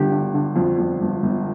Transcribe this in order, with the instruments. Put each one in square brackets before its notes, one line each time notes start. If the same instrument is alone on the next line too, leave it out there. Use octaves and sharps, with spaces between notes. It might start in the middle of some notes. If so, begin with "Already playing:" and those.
Already playing: [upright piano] G1 D3 [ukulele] G4
[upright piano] D3
D3
F2
F2
G1
G1